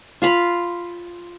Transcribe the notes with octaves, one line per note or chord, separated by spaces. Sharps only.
F4 F5 B5